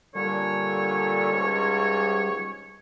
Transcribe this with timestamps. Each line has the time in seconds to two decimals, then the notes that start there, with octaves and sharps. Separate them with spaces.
0.15 A#2 D3 G3 C#5
1.32 C#2 G#2